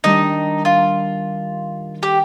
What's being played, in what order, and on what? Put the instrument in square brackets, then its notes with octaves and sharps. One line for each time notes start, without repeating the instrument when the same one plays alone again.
[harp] D#3 G3 D4 [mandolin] D#4
[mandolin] F4
G4